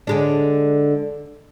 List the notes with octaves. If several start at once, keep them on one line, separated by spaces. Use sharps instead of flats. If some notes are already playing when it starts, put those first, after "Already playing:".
D3 G#3 D4